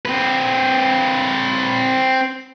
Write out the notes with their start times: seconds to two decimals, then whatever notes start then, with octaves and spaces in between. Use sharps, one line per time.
0.05 C4 B4